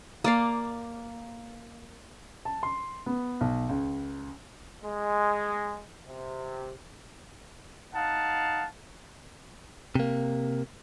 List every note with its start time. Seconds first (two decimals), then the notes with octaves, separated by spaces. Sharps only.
0.24 A#3 D5 F5
2.45 A5
2.63 C6
3.06 B3
3.41 B1
3.69 C#2
4.84 G#3
6.08 C3
7.95 D#4 F5 F#5 A5
9.95 C3 A#3